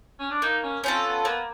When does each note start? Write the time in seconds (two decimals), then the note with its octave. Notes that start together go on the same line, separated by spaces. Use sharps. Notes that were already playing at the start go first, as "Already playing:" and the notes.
0.20 C#4
0.31 D4
0.42 A#3 D#4
0.64 C#4
0.84 C4 C#4 F4 A4
1.05 B3
1.25 A#3 B3